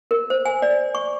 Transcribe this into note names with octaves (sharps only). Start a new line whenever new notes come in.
A#4
C5
G#5
D5
C#6